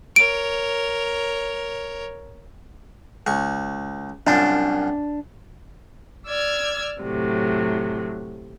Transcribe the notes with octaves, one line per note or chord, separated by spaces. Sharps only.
A#4 C#5 D7
C#2 C#6
C2 F#2 D4 F4
D5 E6 F6 G#6
A2 C3 F#3